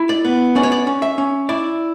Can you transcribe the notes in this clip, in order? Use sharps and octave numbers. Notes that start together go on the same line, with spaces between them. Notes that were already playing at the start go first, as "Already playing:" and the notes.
Already playing: E4
D5
B3
C#4 D5
C#5
D5
C#4
E5
C#4
E4 D5